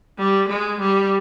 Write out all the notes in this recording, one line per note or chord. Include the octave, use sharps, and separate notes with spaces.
G3
G#3
G3